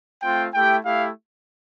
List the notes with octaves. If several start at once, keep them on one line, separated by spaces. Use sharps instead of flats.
A3 C4 F4 G5
A3 E4 G4 G5
A3 E4 G4 F5